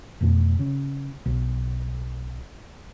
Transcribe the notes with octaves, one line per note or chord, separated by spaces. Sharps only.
F1 F2 B2 A3
C#3
B1